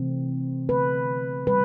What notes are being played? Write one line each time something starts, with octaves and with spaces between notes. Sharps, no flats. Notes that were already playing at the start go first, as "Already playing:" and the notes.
Already playing: C3 E3 A3 C4
D3 A3 B4
B2 G3 B4